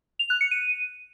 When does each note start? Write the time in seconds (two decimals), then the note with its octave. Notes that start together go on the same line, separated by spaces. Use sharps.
0.19 F7
0.30 F#6
0.41 C#7
0.51 D#7